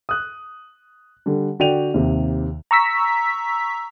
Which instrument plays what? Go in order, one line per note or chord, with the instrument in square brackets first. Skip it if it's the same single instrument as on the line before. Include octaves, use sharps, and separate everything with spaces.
[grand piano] D#6 F#6
D3 G3
D3 F#4 D5 G5 D#7 F7
D#2 C3
[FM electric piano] A#5 C#6 E6 B6